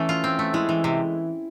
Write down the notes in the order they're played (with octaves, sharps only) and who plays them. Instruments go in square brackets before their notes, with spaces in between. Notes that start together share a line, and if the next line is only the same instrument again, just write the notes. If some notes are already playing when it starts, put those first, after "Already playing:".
Already playing: [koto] E3 A3 [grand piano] C#4
[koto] F4
C4
A3
[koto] G#3 [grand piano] E4
[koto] E3
C3